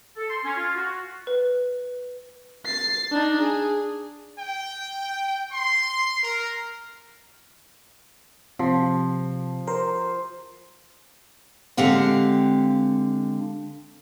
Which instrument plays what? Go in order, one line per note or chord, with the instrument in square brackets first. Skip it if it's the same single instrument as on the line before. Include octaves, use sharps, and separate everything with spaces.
[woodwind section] A4
C6
C#4
F4
F#4
[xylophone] B4
[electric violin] A6 C7
D4 D#4
G#4
[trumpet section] G5
C6
A#4
[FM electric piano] C3 [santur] F3
[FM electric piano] A#4 [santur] C5
[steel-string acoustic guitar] D3 G#3 C4 G4 F5 F#5